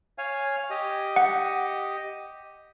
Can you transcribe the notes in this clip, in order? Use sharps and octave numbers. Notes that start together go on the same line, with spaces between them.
C#5 F5 G#5
G4 D#5
F#5